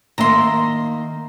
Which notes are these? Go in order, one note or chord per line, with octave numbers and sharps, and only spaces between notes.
D#3 A#3 E5 A#5 C6